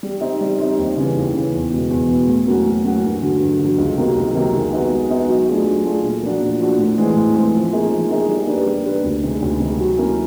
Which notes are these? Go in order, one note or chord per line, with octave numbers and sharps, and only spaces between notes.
G3
C4 D#4
G3
C4 D#4
D#2
C#3 E3
D#2
C#3 E3
E2
B2 G#3
E2
B2 G#3
A2
F#3 A#3 C#4 F#4
A2
F#3 A#3 C#4 F#4
G2
D3 F#3
G2
D3
F#3
C#2
C3 D#3 F#3 A#3
C#2
C3 D#3 F#3 A#3
G#3
B3 D#4 F#4
G#3
B3 D#4 F#4
F#3
A3 D4 F4 G#4
F#3
A3 D4 F4 G#4
A#2
F3 A#3 D4 F#4
A#2
F3 A#3 D4 F#4
A2
E3 G#3 C4
A2
E3 G#3 C4
F3
A#3 D#4 G#4
F3
A#3 D#4 G#4
G3
A#3 D4 G4 B4
G3
A#3 D4 G4 B4
D2
C3 D#3 G#3
D2
C3 D#3 G#3
F#3
A#3 C#4 E4